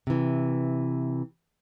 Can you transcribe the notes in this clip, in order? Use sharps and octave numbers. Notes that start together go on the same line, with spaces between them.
C3 E3